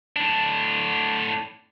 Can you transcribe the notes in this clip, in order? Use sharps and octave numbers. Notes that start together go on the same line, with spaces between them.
A2 D4